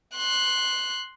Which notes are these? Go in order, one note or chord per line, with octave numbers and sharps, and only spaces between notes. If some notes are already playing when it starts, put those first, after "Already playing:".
C6 F#6